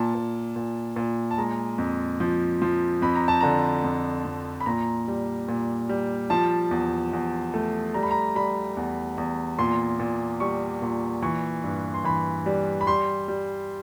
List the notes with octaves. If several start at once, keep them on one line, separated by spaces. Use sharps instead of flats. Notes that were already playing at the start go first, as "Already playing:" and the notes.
Already playing: A#2 A5
A#2
A#2
A#2
A5
G#3 A#5
F2
F3
F3
F2 B5
A#5
A5
D3 A#5
F2
F2
B5
A#2 A#5
G3
A#2
G3
F3 A5
E2
E2
A3
G3 A#5
B5
A#5
G3 B5
E2
E2
A#2 C6
A#2
G3 C#6
A#2
E3 C#6
G2
C6
E3 B5
G3
B5
G3 C6
G3